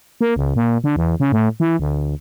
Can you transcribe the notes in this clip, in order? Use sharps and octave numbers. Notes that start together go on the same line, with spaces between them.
A#3
C#2
A#2
D3
E2
C#3
A2
E3
D2